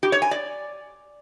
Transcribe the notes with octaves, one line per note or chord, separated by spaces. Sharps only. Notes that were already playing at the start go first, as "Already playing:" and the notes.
G4
C#5
G#5
D5